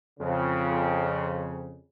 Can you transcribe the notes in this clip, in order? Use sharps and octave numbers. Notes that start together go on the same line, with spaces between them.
F2 C#3